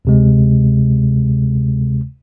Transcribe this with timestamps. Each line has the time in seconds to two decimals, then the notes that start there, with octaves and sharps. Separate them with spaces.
0.05 D2 C3 G#3